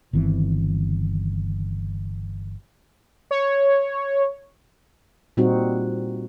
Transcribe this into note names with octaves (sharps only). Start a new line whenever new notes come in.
G1 D#3 E3 C4
C#5
A#2 G3 C4 D#4 F#4